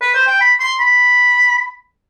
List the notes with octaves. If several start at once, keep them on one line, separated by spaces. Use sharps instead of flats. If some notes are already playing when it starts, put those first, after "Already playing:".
B4
C5
G5
B5
C6
B5